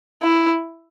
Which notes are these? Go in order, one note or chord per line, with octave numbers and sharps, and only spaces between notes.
E4